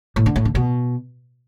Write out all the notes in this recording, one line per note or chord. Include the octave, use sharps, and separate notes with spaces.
A2
D3
A2
D3
B2